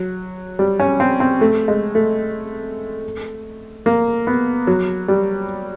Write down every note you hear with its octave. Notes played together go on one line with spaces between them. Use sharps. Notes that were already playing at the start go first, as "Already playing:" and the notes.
Already playing: F#3
G3
C#4
C4
C4
A3
G#3
A3
A#3
B3
F#3
G3